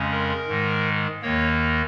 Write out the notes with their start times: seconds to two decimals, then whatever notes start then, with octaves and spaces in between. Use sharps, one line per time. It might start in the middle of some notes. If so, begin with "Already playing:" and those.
Already playing: F2 C#3 G#3 C#4
0.11 A#4
0.48 G#2 D#3 G#3
1.22 D#2 D#3 A#3 C#5